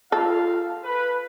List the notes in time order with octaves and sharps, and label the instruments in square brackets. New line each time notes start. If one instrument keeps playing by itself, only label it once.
[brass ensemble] F4 F5 [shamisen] A4
[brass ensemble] B4